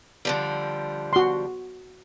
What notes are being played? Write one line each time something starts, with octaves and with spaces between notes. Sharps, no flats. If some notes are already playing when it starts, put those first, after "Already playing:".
D3 F3 G3
F#4 C6